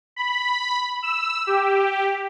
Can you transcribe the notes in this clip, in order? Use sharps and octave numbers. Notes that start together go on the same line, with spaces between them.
B5
E6
G4